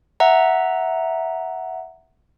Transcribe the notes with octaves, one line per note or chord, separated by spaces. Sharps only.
E5 F#5 A#5